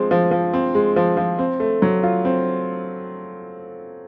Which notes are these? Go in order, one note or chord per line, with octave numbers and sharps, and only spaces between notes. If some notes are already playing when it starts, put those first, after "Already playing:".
Already playing: F3 G#3 C4
F3
F3
C4
G#3
F3
F3
C4
A3
F#3
F4
C4